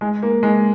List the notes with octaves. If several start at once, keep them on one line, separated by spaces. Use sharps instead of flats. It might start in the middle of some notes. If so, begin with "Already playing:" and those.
G#3
A#3
G#3